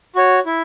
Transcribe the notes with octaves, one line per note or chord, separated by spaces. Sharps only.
F#4 C#5
E4